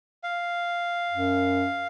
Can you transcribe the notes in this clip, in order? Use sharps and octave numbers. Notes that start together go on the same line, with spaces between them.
F5
F#2